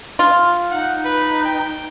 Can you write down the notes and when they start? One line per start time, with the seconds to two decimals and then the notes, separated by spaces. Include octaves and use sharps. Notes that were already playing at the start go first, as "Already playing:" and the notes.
0.19 F4
0.71 D#4 F#5
1.05 B4
1.45 G5